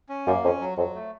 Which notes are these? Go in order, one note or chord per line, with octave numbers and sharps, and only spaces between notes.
C#4
F#2 A#3
F2 C#4
F#3
F2 F#3
A3